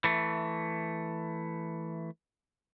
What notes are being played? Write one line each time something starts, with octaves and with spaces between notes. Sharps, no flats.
E3 A3